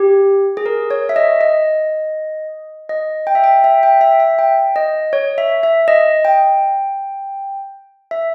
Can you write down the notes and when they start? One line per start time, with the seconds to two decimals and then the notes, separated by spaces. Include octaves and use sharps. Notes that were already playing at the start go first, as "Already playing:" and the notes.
Already playing: G4
0.57 G#4
0.66 A#4
0.91 C#5
1.09 E5
1.16 D#5
1.41 D#5
2.89 D#5
3.27 G5
3.35 E5
3.44 G5
3.64 E5
3.83 G5
4.01 E5
4.20 E5
4.39 G5
4.76 D#5
5.13 C#5
5.38 E5
5.63 E5
5.88 D#5
6.25 G5
8.11 E5